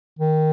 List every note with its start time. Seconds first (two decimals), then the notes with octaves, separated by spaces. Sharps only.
0.19 D#3